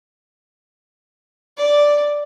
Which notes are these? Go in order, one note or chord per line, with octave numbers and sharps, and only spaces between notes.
D5